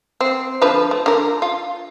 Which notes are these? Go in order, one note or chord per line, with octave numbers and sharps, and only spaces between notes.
C4
D3 F3 B4
A3
D3 A#4
F4